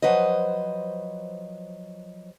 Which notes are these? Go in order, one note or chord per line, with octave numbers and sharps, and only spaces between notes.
F3 F#3 B4 C5 D#5